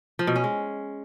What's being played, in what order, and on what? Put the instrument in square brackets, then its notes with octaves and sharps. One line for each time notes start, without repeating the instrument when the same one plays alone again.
[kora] F3
B2
C#4
G#3